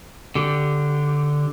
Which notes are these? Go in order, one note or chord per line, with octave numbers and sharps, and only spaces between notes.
D3 G4